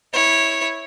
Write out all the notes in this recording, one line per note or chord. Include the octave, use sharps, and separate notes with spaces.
E4 C#5